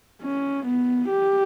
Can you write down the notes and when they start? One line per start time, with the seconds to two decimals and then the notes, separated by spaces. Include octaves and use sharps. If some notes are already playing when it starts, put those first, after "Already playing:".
0.23 C#4
0.66 B3
1.09 G4